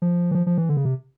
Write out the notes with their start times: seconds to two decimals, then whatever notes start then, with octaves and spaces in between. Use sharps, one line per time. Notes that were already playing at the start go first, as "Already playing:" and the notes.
0.02 F3
0.31 E3
0.35 F3
0.47 F3
0.58 E3
0.69 D3
0.77 C#3
0.85 C3